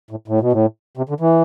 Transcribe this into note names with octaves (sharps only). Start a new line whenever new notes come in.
A2
A2
B2
A2
C3
D3
E3